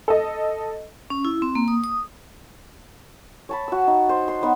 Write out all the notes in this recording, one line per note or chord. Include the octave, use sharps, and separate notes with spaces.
A4 D#5
C#4
E4
C4
A#3
D#6
D#6
C#5 A5 B5
F#4 E6
D#4
C5
C6
F#3 B3 D#4